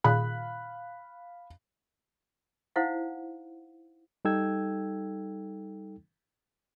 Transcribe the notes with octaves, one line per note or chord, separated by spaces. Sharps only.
A#2 D#3 G#4 F5 B5 F#6
D#4 E4 C5 F5 F#5
G3 D#4 A4 G5 E6 G#6